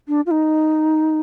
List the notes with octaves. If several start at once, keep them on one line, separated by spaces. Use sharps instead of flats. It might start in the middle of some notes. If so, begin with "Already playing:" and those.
D4
F4
D#4